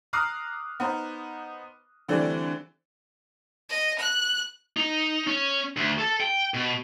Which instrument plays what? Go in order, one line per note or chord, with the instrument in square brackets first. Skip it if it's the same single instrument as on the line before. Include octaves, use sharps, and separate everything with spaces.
[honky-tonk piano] A#5 D6 D#6 F6 F#6 C7
B3 D#4 C5
D3 E3 G3 A3 C4 D4
[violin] D#5
F#6
[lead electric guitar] D#4
C#4
D2
A4
G5
B2